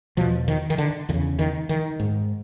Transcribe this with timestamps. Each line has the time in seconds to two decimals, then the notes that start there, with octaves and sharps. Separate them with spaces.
0.17 E2 B2 F3
0.48 D#3
0.70 D#3
0.78 D3
1.09 E2 D3
1.14 C#3
1.39 D#3
1.69 D#3
2.00 G#2